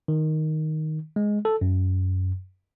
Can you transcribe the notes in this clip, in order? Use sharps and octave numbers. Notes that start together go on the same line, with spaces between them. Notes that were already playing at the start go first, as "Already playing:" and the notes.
D#3
G#3
A4
F#2